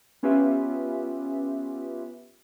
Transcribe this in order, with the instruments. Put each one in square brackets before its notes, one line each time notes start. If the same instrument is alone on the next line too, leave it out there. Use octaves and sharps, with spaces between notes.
[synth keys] B3 C#4 F4 G4 B4 E5